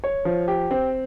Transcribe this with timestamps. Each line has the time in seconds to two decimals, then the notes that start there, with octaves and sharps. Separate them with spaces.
0.04 C#5
0.25 F3
0.48 G4
0.71 C4